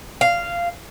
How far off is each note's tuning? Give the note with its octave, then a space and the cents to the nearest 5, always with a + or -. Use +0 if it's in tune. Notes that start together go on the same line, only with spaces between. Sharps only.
F5 -10